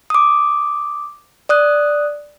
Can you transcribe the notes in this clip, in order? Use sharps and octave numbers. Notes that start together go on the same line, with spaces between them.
D6 D#6
D5 D#6 F#6